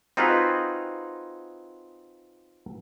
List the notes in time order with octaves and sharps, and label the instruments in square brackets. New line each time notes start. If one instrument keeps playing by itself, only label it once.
[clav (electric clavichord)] C4 D#4 F4 F#4 G#4 B4